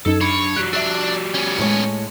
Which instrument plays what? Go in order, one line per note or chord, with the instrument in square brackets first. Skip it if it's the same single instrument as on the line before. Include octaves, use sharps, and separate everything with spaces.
[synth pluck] F#2 D#4 G#6 [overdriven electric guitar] A4
[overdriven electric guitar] D4 B5 [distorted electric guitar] C#5
[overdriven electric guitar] G3 F#4 [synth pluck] F#6 B6 D7
[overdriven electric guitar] G3 F#4 [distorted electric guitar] D4 [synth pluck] E5 E6
[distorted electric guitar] B3 C#4
[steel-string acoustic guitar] A2 G#3 C#5